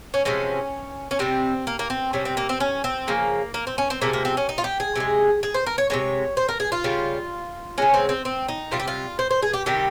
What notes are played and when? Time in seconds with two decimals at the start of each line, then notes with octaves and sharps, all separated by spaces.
0.14 C#4
0.25 C3 F3 G#3 C#4
1.11 C#4
1.19 C3 G3 C4
1.67 A#3
1.79 A#3
1.90 C4
2.13 C3 G3 C#4
2.25 C4
2.37 A#3
2.49 C4
2.60 C#4
2.84 C4
3.08 C#3 F3 G#3 A#3
3.54 A#3
3.67 C4
3.78 C#4
3.90 C4
4.01 C3 F3 G#3 A#3
4.13 A#3
4.25 C4
4.37 C#4
4.49 D#4
4.58 F4
4.64 G4
4.80 G#4
4.96 C3 F3
5.00 G#3
5.43 G#4
5.54 C5
5.66 A#4
5.78 C#5
5.90 C3 F3 G#3 C#5
6.37 C5
6.49 A#4
6.60 G#4
6.72 F4
6.84 C#3 G3
7.78 C#3 G#3 C#4
7.94 C4
8.09 C4
8.25 C4
8.48 D#4
8.71 C3 G3 F4
8.80 G4
8.88 F4
9.19 C5
9.31 C5
9.42 G#4
9.54 G4
9.66 C3 D#3 G3 G4